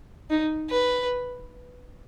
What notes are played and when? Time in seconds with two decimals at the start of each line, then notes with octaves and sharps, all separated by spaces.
0.30 D#4
0.69 B4